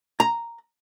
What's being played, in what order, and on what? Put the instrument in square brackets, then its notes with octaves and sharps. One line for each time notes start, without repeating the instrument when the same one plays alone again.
[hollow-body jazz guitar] A#5